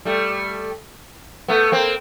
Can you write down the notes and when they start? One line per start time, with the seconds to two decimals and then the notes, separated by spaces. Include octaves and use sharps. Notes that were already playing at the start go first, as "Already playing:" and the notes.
0.05 G3 A3
1.48 A3 B3
1.72 A#3 C4